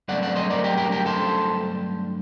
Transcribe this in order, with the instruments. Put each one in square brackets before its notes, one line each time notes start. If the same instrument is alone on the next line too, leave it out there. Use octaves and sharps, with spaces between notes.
[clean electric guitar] G2 D3 F#3 A3 C4 D5 F#5
D5 F#5
C5 D#5
A#4 D5
G4 A#4
G4 A#4
G4 A#4
A4 C5